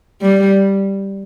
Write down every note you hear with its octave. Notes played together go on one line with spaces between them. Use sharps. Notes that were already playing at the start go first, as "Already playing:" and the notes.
G3